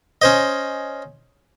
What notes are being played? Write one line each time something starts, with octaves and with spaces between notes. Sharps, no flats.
C#4 C5 D#5